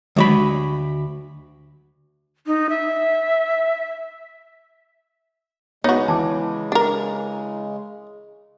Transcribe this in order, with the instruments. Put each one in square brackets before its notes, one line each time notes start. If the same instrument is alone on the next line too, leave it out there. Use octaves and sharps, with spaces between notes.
[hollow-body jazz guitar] D2 F#4 B5 [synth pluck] D#3 F#3 G#3
[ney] D#4
E5
[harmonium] C#3 G#3 [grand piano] B3 [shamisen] D#4 F#4 [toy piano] C#5
[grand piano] E3 D6 [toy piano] A5
[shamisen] D4 A#4